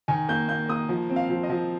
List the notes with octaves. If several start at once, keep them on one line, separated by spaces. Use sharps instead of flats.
D#3 G#5
A#3 G6
A#3 G6
A#3 D#6
F3
C4
F5
F3
D#5
F3